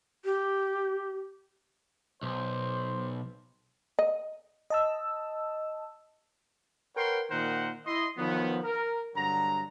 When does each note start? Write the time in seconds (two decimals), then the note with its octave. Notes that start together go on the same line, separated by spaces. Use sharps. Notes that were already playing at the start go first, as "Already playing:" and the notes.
0.25 G4
2.23 B1 C5
3.99 D#5
4.70 D#5 A5 E6
6.96 A#4 B4 C#5 F#5 G5 C6
7.31 A#2 D#3 A#4 C5 F#5
7.86 E4 D#5 C6
8.18 D#3 F3 F#3 B3
8.64 A#4
9.15 G2 D3 F#3 A#5